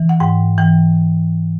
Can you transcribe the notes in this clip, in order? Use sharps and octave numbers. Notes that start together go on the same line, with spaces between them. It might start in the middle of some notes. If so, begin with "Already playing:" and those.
Already playing: E3
F#5
G#2 G5
E3 G5